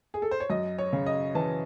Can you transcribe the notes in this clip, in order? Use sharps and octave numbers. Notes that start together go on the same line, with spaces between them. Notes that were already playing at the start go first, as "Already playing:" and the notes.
G#4
A4
C5
C#5
F#2 D#5
C#5
C#3
D#5
E3 A5